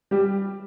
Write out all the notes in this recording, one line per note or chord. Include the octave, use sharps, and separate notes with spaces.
G3 G4